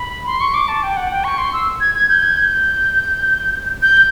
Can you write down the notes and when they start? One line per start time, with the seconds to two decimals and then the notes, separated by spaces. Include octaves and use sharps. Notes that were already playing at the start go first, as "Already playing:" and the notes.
Already playing: B5
0.26 C6
0.41 C#6
0.54 D6
0.68 A5
0.83 G5
0.97 F#5
1.11 G5
1.24 C#6
1.38 C6
1.53 E6
1.80 G#6
1.94 G#6
2.09 G6
2.23 G#6
2.37 G6
3.82 G6